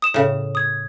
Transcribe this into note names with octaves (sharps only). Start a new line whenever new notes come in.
D#6 E7
A2 C#3
D#6 G#6